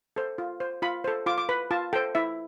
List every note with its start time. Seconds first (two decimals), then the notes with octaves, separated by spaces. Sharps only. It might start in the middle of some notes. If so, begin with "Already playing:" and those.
0.16 A4 C5
0.38 F4
0.60 C5
0.82 F4 B5
1.04 A4 C5
1.26 F4 D6
1.38 D6
1.49 B4 B5
1.71 F4 A5
1.93 A4 C5 G5
2.15 E4 E5